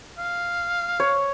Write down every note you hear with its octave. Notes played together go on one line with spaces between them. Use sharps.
F5
C#5